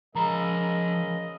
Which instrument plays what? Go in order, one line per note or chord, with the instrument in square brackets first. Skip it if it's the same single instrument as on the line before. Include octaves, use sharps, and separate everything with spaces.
[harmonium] C#3 G#3 A#4 [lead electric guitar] F3 B5 [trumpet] D#5 [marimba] A#5